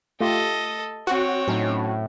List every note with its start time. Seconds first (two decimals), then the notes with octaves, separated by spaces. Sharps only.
0.21 A3 F4 G4 A4 D#5
1.07 C4 F#4 C#5
1.48 A2 F#3 C#4 D#4